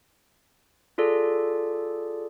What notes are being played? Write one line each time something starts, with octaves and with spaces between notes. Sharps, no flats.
F4 G#4 A4 D5